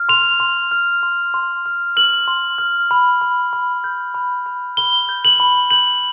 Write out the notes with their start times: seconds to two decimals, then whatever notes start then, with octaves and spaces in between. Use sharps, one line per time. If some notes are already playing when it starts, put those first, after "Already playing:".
Already playing: F6
0.09 C6 F7
0.40 C6
0.71 F6
1.03 C6
1.34 C6
1.66 F6
1.96 F6 F#7
2.28 C6
2.58 F6
2.91 B5
3.21 B5
3.53 B5
3.84 G6
4.14 B5
4.46 B5
4.77 B5 G7
5.09 G6
5.25 F#7
5.40 B5
5.71 G6 F#7